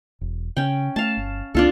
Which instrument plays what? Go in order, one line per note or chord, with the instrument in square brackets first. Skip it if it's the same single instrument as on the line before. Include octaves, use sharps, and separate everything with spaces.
[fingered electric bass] E1
[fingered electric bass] C#3 [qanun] C#4 G5
[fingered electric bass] A3 [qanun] F5 A5
[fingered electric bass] G1
[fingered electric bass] C#2 A#3 C4 [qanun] D4 F4 A4